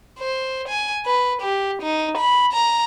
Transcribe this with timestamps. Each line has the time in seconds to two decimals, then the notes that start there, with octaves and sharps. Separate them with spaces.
0.19 C5
0.68 G#5
1.06 B4
1.41 G4
1.82 D#4
2.17 B5
2.53 A#5